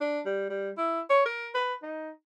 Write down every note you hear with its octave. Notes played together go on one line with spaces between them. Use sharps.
D4
G3
G3
E4
C#5
A#4
B4
D#4